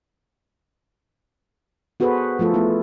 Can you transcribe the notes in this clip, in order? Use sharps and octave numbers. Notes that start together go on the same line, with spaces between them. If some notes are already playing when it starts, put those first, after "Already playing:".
B3 F#4 G#4 A4 B4 C5
F3 A3 F4 A4
A3 B3 E4